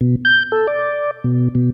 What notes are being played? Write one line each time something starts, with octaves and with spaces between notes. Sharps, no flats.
B2
G6
A4
D5
B2
B2